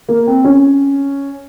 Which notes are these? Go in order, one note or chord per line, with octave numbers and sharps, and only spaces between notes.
A#3
C4
C#4